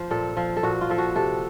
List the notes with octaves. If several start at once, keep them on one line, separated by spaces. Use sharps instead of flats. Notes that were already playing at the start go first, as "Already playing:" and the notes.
Already playing: F3 C5
A#2 A4
F3
A4
A#2 F#4
F4
F3 A4
F#4
C3 A4